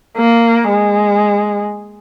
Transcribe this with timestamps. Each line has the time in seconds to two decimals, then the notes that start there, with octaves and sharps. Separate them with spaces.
0.18 A#3
0.69 G#3